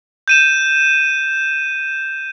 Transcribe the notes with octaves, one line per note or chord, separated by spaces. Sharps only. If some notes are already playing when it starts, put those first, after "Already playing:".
G6 D#7 E7